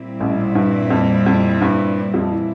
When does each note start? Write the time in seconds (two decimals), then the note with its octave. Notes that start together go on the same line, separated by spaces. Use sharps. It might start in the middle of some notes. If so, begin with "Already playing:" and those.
Already playing: A#2 G3 C4 E4
0.20 A1 A2
0.55 G2
0.90 F2
1.26 F2
1.61 G2
2.14 F2 F3
2.32 E3